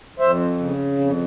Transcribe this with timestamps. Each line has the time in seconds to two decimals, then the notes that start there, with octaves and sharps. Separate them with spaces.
0.20 F2 C5 E5
0.59 C#3
0.98 F2